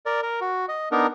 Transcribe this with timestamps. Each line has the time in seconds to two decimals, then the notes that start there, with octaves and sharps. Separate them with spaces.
0.06 A#4 D5
0.22 A#4
0.41 F#4
0.69 D#5
0.92 B3 D4 D#4 A#4